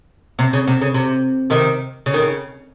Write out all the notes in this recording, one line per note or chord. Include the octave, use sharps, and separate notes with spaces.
C3
C#3
C3
C#3
C3
C3 D#3
C#3
D#3
C#3